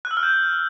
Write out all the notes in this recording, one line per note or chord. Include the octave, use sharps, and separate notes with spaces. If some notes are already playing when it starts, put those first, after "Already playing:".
F#6
E6
F6
G6